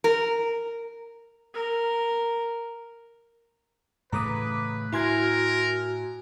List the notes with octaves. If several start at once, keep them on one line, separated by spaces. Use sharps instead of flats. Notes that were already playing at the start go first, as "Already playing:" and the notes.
A#4
A#4
A2 C#3 E3 B4 A#5 D6 D#6
A2 E4 F#4 A#4 G#5 C6 G#6